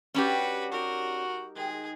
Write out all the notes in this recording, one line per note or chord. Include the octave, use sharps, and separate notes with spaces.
G3 C#4 D4 F#4 G4 B4
D#4 F#4 A#4
D#3 G#3 G#4